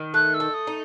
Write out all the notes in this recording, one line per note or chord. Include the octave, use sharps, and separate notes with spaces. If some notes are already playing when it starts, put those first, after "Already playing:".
Already playing: D#3
A3 F#6
E6
A3
D#6
D#4